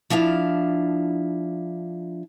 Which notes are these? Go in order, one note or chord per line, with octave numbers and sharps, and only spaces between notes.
F3 D4 E4 F5